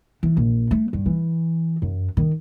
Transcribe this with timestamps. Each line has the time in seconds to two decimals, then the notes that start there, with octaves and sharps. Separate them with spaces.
0.23 E3
0.37 A#1
0.71 A3
0.93 G2
1.06 E3
1.82 F#2
2.17 D#3